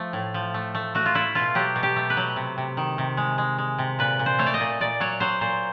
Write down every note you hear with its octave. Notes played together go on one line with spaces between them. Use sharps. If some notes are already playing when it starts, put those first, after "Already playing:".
Already playing: F3 A3
A2
F3
A3
A3
A3 F#4
F4
A3 E4
B2 F4
F#3 G4
B2
G4
A3
B4
F#3
C3
C3
D#3
C3
G#3
G#3
G#3
C3
A#2 B4
A#2
C5
A3 C#5
D5
D#5
A#2
A#2 D5
F#3 C#5
F#3 C5
A#2 C5